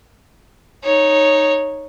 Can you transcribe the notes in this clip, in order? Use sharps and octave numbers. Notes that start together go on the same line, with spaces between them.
D#4 C#5